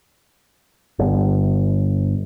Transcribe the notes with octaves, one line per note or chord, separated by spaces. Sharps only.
G1